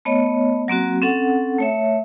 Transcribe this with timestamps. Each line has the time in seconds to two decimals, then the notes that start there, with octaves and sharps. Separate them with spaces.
0.05 A3 B3 C#5 D#5
0.68 F#3 A#3 C4 F#4
1.02 C4 C#4 A4 F#5
1.58 A3 C#5 E5